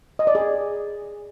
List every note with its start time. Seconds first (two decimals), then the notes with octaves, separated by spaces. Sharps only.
0.19 D#5
0.27 D5
0.35 G#4